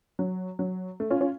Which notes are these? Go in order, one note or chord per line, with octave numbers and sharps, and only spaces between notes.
F#3
F#3
A3
C#4 F4
C#4 F4